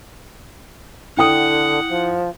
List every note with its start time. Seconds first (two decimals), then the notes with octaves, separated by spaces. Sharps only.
1.17 D3 E4 F#5 G5 D#6
1.89 F3